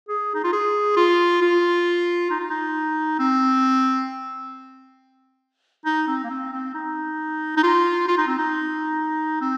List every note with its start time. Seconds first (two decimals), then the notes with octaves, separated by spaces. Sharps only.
0.08 G#4
0.35 D#4
0.44 F4
0.53 G#4
0.96 F4
1.41 F4
2.31 D#4
2.40 F4
2.50 D#4
3.19 C4
5.85 D#4
6.07 C4
6.24 A#3
6.30 C4
6.52 C4
6.74 D#4
7.57 D#4
7.63 F4
8.08 F4
8.17 D#4
8.27 C4
8.38 D#4
9.41 C4